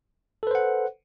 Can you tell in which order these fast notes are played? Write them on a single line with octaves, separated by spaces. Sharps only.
A4 B4 C5 F#5